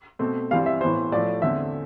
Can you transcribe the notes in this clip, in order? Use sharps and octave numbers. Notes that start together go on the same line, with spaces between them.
B2 A3 C4
G2 E3 G3 C4 F5
E5
A2 E3 B3 C5
A2 F3 A3 D5
E2 D3 A3 C4 E5